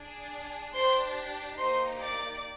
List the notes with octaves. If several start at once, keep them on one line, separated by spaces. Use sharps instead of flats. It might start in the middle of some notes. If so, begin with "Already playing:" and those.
Already playing: D4 G#4
D4 G4 C5 C6
A#3 D#4 G4 C5 C6
D5 D6